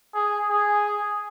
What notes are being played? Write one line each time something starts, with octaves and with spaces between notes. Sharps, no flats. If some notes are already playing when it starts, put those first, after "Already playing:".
G#4
G#4